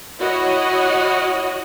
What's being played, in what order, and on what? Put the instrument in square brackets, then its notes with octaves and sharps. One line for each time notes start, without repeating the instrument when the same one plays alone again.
[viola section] E4 F#4 C#5 D#5 F#5